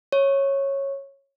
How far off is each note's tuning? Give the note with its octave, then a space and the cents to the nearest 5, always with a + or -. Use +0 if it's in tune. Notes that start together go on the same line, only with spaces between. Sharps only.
C#5 -10